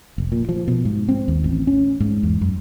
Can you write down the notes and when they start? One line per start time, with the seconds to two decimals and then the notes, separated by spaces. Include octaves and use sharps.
0.18 F1
0.32 A#2
0.49 F3
0.68 B2
0.85 G#2
1.09 C4
1.28 D#2
1.44 A1
1.67 C#4
2.00 G#2
2.23 E2
2.41 F#2